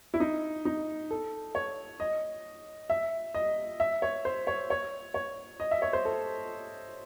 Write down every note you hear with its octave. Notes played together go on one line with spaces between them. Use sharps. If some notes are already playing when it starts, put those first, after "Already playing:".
E4
D#4
D#4
A4
C#5
D#5
E5
D#5
E5
C#5
C5
C#5
C#5
C#5
D#5
E5
C#5
C5
A4